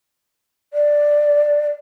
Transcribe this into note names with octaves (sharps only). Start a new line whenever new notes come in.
D5